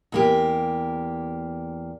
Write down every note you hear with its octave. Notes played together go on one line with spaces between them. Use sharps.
E2 A#3 G4